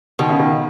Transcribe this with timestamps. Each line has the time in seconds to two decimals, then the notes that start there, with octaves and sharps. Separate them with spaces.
0.19 B2 D#3
0.29 C#3
0.40 D#3